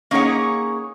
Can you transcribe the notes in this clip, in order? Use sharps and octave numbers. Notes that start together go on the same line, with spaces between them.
A#3 C#4 D#4 G#4 C#5 F#5